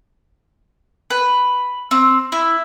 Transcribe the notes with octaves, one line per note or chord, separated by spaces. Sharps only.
B4
C4
E4